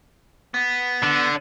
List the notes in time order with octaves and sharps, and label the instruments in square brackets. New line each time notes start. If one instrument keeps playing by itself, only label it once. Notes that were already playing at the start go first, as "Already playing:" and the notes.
[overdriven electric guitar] B3
[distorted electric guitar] D3